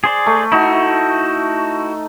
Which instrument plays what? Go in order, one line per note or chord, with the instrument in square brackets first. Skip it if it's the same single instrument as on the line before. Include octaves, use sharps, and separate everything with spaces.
[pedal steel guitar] G#4 C5 D5
[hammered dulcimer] A3
[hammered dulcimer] D#4 [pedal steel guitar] E4 F#4